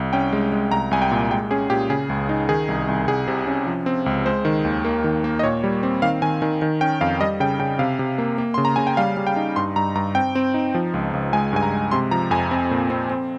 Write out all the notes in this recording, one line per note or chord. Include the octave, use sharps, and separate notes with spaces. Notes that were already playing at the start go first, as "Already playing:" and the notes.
Already playing: C2
C#4 G5
G#3
G#3
C2 A#5
C2 G#5
G5
A#2
G#3 G5
C#4 G#4
A#2 G4
C#3 G#4
C#2
D#4
D#3 G#4
C2
C2
C2 G#4
C3
C#4
F3
C4
C#2
G#3 C5
D#3
D#2
A#3
D#3
A#3
D#5
A#2 C#5
G3
C4
D#3 F5
D#3 G#5
D#3 G#5
D#3
C#4 G5
F2 F5
G3 D#5
C#3 G5
C#3 G5
C3 F5
C3
A#3
A#3
C#3 C6
A#5
C#3 G#5
G5
G3 F5
G3
G5
D#4
G2 C6
G2 A#5
G2 A#5
C4 G5
C4
D#4
F3
C#2
C#2
G#3 G#5
G2 G#5
A#5
G#3
C3 C6
F3 A#5
F2 G#5
C4
A#2
C4
C4